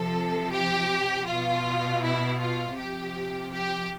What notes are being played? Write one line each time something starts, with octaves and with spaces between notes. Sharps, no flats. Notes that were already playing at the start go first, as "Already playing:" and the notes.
Already playing: C3 F3 A4
G4
B2 F4
E4
F4
C3 F3 G4
G4